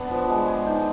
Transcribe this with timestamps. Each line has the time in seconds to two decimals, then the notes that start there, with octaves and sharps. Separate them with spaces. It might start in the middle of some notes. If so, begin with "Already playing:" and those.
Already playing: B3 D4
0.11 F3
0.29 G#3
0.48 G#4
0.66 D#4